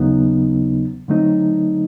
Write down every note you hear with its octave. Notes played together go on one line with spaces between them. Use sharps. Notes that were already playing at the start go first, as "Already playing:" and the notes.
Already playing: D#2 C#3 F#3 B3 D#4
D3 F#3 A3 C4 D#4